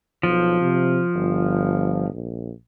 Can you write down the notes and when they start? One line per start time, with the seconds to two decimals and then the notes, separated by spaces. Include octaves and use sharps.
0.23 B1 F3
0.61 C3
1.15 G1
2.13 A#1